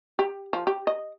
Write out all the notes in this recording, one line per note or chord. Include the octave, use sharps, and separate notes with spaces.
G4
F3
G4
D#5